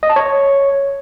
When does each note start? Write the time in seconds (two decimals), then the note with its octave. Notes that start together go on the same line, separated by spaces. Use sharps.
0.03 D#5
0.10 A5
0.16 C#5